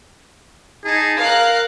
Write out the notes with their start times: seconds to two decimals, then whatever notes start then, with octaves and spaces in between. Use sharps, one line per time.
0.85 D#4 G#4 A5
1.19 A#4 F5 A#5 F#6